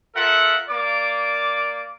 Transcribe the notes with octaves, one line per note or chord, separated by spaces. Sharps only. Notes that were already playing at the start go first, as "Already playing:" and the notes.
F4 A4 A#4 E5 F#5
A#3 D5 D6